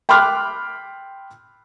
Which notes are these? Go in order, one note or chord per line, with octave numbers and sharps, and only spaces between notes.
G5 B5 C6 D6 F6 F#6